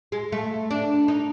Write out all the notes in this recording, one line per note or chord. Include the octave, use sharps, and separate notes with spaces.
G#3
A3
D4
D#4